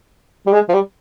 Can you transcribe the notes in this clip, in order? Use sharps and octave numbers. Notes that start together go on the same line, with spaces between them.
G3
G#3
F3
G3